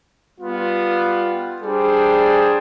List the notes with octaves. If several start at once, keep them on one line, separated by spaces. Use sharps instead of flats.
G3 B3 F4
G3 D4 G#4 C5